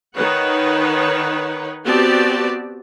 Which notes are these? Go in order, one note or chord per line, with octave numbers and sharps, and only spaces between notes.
D#3 D#4 B4 C#5 F#5
B3 C4 F#4 G4 D5 A5